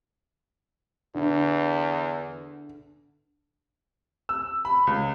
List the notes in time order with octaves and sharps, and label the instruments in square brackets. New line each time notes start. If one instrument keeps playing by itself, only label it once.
[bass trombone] E2 [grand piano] D3
[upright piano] E6
B5
C#2